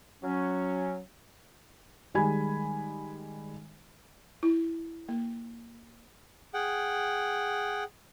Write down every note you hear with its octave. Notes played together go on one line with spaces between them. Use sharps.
F#3 C#4
D#3 G3 G#3 G#5 B5 G#6
E4
A#3
G#4 F#5 G5